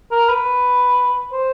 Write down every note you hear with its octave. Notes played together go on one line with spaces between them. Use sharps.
A#4
B4
C5